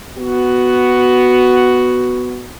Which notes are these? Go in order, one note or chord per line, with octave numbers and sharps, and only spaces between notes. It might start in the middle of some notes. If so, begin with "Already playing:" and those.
B3 F#4